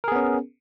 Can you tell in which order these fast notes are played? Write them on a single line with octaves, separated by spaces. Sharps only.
A#4 G#4 B3 C#4